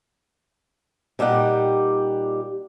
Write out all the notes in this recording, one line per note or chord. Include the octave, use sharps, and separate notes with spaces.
A#2 G3 D#4 G4 F#5